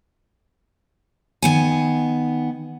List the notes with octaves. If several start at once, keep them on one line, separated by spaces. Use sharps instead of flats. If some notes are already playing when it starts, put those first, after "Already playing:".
D#3 B3 G#5